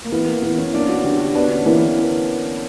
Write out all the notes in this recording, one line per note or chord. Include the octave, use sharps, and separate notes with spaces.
A#3
E3 B3
A#3
E3 B3
C#4
A#3 D4
F#4
D3 G4
F#4
B3 D4
C#4
E3 A#3